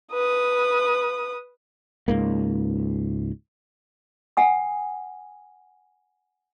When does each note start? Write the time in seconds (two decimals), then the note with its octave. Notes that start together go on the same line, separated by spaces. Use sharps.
0.13 B4 D#6
2.08 C#2 G#2 A#3
4.37 F#5 G#5 D#6